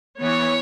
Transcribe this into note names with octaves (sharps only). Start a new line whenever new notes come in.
E3 B3 C#5